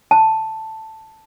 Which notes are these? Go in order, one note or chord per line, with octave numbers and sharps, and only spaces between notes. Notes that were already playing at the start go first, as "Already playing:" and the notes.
A5